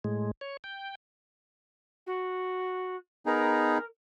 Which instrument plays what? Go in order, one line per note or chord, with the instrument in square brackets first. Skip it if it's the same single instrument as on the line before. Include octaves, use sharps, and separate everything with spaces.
[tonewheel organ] A2 G#3
C#5
G5
[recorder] F#4
[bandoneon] B3 D#4 G#4 [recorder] A#4